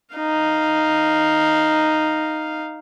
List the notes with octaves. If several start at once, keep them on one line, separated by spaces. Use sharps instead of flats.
D#4 F5